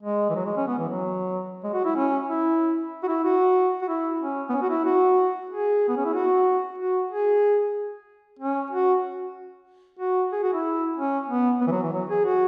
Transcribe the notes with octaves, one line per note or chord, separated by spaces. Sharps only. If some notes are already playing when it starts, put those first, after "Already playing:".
G#3
E3
F#3
G#3
C#4
B3
E3
F#3
G#3
F#4
E4
C#4
E4
F#4
E4
F#4
F#4
E4
C#4
B3
C#4
F#4
E4
F#4
G#4
B3
C#4
E4
F#4
F#4
G#4
C#4
F#4
F#4
G#4
F#4
E4
C#4
B3
B3
E3
F#3
E3
F#3
G#4
F#4